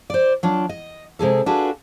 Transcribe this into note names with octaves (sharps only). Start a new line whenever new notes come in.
C5 D5
F#3 D4 F4
D#5
C3 G#3 G#4 A4
D4 F4 F#4 G#4 A4 B4